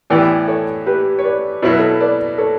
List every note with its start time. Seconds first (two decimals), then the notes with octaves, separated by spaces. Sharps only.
0.10 A2 E3 B3 E4 G4 B4 D5
0.48 A4 C#5
0.86 G4 B4
1.18 C#5
1.24 B4 D5
1.62 B2 F#3 B3 E4 C#5
1.70 B4
1.79 A4 C#5
2.00 B4 D5
2.38 A4 C#5